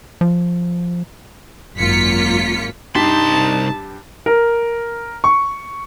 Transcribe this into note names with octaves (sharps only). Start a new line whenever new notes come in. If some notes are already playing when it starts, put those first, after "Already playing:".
F3
G#1 F#2 A#3 F4 B6 C#7
C2 G2 D#4 G4 A5 C6 B6
A#4
C#6